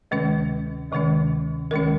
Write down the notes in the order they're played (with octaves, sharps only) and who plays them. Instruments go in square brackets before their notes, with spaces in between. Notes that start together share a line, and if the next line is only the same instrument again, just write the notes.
[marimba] D2 C3 D#3 G#3 C#4 B4
D2 C3 D#3 G#3 C#4
D2 C3 D#3 G#3 C#4 A#4